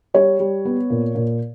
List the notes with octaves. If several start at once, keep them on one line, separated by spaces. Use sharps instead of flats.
G3 C#5
G3
B3
A#2
A#2